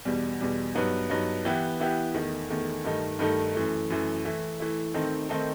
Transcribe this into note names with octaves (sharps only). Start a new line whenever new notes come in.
E2 B2 G3
E2 B2 G3
G2 F#3 B3 D#4
G2 F#3 B3 D#4
E3 B3 E4 G4
E3 B3 E4 G4
E2 D#3 A3
E2 D#3 A3
G2 D#3 A3 D#4 A4
G2 D#3 A3 D#4 A4
F#2 E3 A3
F#2 E3 A3
E3 A3 E4
E3 A3 E4
D#3 A3 C4 D#4 A4
D#3 A3 C4 D#4 A4